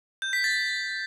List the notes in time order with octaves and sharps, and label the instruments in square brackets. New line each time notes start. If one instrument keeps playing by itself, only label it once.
[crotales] G6
B6
A6